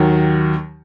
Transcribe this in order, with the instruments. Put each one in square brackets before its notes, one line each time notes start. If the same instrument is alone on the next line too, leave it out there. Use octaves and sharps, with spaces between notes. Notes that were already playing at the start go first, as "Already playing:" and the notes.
Already playing: [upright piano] D#2 D#3 F#3